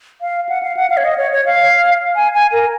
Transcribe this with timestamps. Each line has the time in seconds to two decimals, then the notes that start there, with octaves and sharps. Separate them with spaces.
0.21 F5
0.49 F#5
0.63 F5
0.77 F#5
0.90 F5
0.97 C#5
1.04 D#5
1.18 C#5
1.32 C#5
1.46 F5
2.15 G#5
2.34 G#5
2.52 A#4